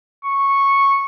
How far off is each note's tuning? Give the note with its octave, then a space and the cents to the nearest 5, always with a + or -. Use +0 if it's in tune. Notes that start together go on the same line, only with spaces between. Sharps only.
C#6 -5